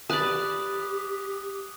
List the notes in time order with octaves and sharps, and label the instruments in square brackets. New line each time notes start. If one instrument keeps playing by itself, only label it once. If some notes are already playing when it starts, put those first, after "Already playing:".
[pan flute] G4 [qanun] B4 D5 [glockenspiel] D#6 F#6